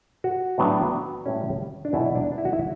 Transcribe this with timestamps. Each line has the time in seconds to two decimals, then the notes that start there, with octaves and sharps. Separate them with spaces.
0.24 F#4
0.58 A2 F#3 B3 D4
1.26 A2 G3 C#4
1.85 D4
1.93 E2 B2 F#3 E4
2.15 D4
2.38 E4
2.45 F#4
2.53 E4